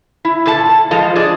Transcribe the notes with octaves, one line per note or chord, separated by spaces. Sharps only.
E4
A#2 E4 A4 A5
F3 G#3 F4 A4 C5 D#5
D4 G#4 D5 D#5